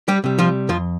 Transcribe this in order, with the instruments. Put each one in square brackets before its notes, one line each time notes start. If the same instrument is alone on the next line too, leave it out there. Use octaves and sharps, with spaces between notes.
[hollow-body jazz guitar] G3 G4
C3 G3
F3 F4
F2 F3 F4